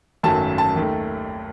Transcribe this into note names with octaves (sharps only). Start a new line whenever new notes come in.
G#1 F#2 D#3 F#3 A3 A5
A5
D#2 D#3 A3